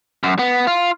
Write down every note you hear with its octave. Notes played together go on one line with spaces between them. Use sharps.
F#2
B3
F4